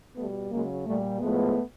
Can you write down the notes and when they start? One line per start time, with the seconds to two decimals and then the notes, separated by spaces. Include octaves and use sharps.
0.16 B2 G3 A3 B3
0.51 C#3 F#3 G#3 A#3
0.85 A#2 G3 A3
1.19 A2 F3 G#3 A3 B3